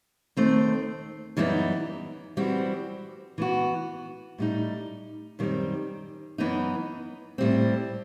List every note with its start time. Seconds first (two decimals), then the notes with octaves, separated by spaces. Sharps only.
0.37 D#2 D#3 A3 C4
1.37 F#2 E3 G3 B3 D#4
2.37 E3 G3 C4 F#4
3.38 E3 B3 F#4
4.38 A2 G3 D#4
5.39 F#2 D#3 G3 C4
6.38 F#2 E3 B3 D#4
7.38 A2 G3 C4